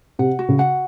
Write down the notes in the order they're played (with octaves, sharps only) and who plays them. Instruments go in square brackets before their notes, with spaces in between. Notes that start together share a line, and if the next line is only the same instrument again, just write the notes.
[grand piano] C3 [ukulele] F#5
[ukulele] F#4
[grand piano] C#3
[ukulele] F#5